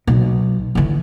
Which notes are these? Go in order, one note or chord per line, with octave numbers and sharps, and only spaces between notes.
B1
D3 E3